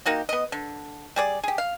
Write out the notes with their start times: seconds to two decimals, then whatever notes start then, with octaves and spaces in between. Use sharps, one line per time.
0.06 A#3 D#4 F#4 G4
0.29 B3 D#5
0.52 D3
1.16 G3 G#4 D5
1.44 G4 G#4
1.58 F5